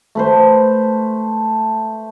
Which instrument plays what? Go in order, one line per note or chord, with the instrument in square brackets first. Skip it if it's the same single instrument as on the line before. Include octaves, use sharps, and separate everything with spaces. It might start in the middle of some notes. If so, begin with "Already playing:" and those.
[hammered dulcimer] A3 B4 C5